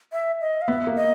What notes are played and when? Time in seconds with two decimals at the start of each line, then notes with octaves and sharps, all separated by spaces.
0.12 E5
0.41 D#5
0.61 F5
0.67 B3 E5
0.87 A#3
0.95 D#5